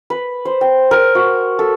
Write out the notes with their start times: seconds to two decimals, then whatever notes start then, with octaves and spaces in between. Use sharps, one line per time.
0.10 B4
0.45 C5
0.61 G5
0.91 A#4
1.15 F#4
1.59 A4